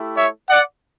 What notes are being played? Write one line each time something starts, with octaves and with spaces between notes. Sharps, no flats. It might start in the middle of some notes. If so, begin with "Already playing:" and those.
Already playing: A3 E4 G4
C#5 E5
D5 F#5